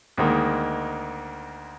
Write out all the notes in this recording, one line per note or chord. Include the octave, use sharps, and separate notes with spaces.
D2 D#3 G#3 A#3